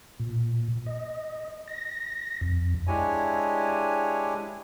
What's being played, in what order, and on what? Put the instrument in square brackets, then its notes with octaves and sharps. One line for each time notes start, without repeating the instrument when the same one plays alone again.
[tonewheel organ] A#2
D#5
A#6
F2
[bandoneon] G#3 D4 E4 G4 C#5 G#5